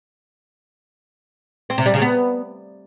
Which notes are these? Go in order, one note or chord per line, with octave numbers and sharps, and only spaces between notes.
C4
C3
G3
C#3
B3